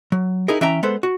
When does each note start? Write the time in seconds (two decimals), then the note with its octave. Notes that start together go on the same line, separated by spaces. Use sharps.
0.12 F#3
0.48 D#4 E4 G#4 A#4
0.61 E3 C#4 E5 G5 A#5
0.83 G#3 B3 A4 B4 C5
1.03 F#4